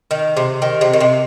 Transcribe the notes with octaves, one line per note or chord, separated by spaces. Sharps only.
D#3
C3
D#3
C3
D#3
C3